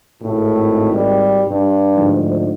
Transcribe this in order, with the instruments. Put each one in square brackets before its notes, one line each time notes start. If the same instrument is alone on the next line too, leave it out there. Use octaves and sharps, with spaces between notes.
[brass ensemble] G#1 [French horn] A2
[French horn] G3
G2
[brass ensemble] D2 G#2 F3